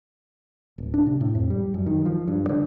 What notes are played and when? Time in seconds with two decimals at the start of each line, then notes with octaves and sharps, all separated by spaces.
0.78 D1
0.94 D4
1.06 C3
1.21 A2
1.35 F2
1.50 G3
1.74 F#2
1.86 D#3
2.05 F3
2.28 G2
2.49 D3